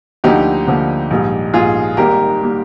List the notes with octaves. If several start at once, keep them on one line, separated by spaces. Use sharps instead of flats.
D2 D3 F3 A#3 D#4 G4
D2 D3 F3 A#3
A#1 G#2 G3
A#1 G#2 G3 F4 G#4
G#1 G#2 G3 A#3 G4 A#4
G3 A#3